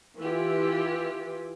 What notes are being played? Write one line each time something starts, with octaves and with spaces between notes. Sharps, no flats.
E3 E4 F4 G4